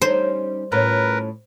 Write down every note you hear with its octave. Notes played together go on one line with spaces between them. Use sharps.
G3 C#4 D#4 C5
A2 C#4 F4 A#4 B4